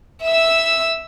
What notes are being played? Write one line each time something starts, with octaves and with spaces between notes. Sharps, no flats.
E5 E6